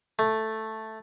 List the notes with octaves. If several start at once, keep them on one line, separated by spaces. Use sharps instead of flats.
A3